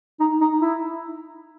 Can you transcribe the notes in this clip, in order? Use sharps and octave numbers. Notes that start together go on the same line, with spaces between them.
D#4
D#4
E4